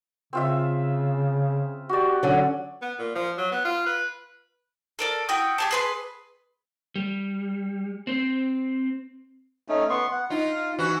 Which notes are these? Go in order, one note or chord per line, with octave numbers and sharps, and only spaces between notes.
C#3 C4 F4 E5
F#4 G4 D5
D3 F#3 C#4
B3
A#2
F3
F#3
B3
F4
B4
A4 A#4 D5
E4 F#4 G5 D#6
G4 G#4 A5
G#4 B4 C6
G3
C4 C5
A3 C#4 D#4
B3 C6 C#6
F#5
D#4 F4 F5
E3 F#4 B4